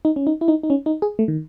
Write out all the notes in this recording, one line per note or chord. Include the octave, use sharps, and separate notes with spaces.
D#4
C#4
D#4
E4
D#4
D#4
C#4
D#4
G#4
A3
D#3